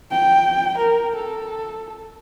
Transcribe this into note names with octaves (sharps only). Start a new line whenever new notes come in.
G5
A#4
A4